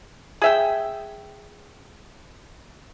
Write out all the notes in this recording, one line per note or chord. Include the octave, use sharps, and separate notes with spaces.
G#4 E5 G5